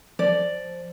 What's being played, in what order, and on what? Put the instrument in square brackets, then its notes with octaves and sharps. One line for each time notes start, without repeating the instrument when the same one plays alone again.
[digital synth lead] F3 [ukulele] D5